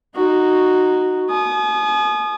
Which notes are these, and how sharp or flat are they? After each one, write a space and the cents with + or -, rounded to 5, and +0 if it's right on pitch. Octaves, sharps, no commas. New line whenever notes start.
D#4 -10 F#4 +0
G#5 +40 D#6 -25